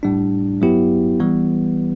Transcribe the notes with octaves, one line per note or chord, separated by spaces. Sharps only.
A2 G3 D4
G2 F#3 B3 E4 G4
E3 G3 B3